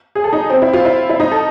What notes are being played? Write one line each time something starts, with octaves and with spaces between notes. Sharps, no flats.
G#4
A4
D#4
C4
E4
F4
E4
E4
D#4
A4